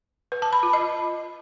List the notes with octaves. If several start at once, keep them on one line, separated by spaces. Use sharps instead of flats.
B4
A5
B5
F4
D#5